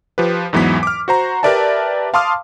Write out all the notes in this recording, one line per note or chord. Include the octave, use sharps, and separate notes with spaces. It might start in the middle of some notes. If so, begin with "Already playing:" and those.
F3 G4 B4
E2 G#2 E3 F#3 B3 B6
D6 F6
F#4 C5 A#5
G4 A#4 B4 D5 E5 A5
F5 A5 C6 D6 D#6 F6